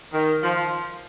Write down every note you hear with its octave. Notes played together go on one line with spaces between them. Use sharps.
D#3
F3